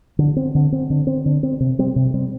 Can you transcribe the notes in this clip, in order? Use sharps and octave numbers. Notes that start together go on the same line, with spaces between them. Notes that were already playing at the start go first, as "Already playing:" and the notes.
D3
C4
D3
C4
D3
C4
D3
C4
C3
G3 C4
C3
G3 C4